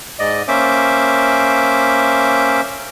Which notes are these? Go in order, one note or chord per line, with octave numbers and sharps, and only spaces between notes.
G#2 D5 D#5
A#3 C#4 C5 E5 D6